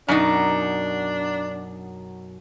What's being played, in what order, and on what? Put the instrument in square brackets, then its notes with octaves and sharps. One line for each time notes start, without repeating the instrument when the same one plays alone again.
[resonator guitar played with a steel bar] F#2 B2 D#4 [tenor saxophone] D4